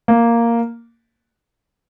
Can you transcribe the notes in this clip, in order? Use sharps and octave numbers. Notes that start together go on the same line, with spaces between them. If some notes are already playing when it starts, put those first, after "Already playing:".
A#3